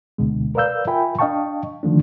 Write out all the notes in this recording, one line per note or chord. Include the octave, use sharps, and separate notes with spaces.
D2 B2 D3 G#3
A#4 B4 D5 F5 E6 G6
F4 A#4 E5 G5 G#5 B5
D4 D#5 F5 G5 A5 C#6
D3 D#3 F3 A3 D4